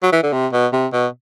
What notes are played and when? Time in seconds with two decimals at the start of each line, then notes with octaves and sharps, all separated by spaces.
0.03 F#3
0.12 E3
0.23 D3
0.33 C3
0.53 B2
0.72 C3
0.93 B2